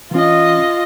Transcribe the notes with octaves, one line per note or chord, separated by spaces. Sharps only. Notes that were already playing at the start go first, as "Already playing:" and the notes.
E3 C#4 F4 D#5